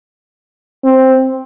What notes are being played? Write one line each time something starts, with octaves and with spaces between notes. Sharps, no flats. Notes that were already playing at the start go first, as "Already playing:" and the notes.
C4